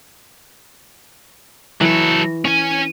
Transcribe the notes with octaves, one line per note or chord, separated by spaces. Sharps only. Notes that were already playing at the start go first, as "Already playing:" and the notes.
E3 F#3 A4 C#6
C#4 G#5 C#6